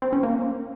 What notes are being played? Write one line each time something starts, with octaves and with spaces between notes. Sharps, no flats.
C4
C#4
A#3